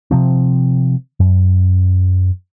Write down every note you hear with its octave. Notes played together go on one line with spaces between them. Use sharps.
C3 F3 C4
F#2